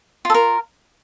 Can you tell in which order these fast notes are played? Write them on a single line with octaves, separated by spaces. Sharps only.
F4 A4 A#4